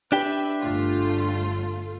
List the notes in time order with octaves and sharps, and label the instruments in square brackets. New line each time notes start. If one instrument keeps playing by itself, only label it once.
[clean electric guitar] D4 G4 G5 [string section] B4 E5
[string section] G1 A3 F4